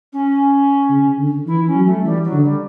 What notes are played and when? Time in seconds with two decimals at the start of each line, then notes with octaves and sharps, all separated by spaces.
0.12 C#4
0.90 C#3
1.19 D3
1.46 E3 E4
1.66 C#4
1.75 F#3
1.85 A3
2.04 E3 G3
2.24 F#3
2.33 D3
2.43 G3